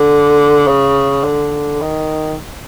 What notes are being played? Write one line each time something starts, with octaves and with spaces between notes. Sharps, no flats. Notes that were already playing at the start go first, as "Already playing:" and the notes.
Already playing: D3
C#3
D3
D#3